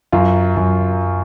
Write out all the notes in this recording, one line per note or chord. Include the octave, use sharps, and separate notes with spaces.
F#2 F4
F#2